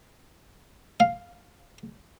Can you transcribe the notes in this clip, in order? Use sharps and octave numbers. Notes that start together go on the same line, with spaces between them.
F5